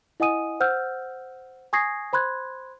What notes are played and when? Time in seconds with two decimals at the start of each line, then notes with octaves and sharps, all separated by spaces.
0.20 E4 D#5 F#5 G#5 D#6 D#7
0.60 C5 F#5 E6 F6 G6
1.73 G#5 C#6 D#6 G#6 A#6 C7
2.13 C5 B5 C6 F#6 G#6